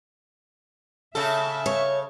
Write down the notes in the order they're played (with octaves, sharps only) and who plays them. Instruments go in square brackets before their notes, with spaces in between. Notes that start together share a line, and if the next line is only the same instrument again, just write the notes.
[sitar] C#3 A4 [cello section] E5
[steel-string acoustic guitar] C#5